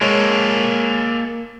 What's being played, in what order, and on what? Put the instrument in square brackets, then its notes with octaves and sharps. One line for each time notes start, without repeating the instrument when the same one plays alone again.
[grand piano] G#3 C#5 [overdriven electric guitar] A#3 A4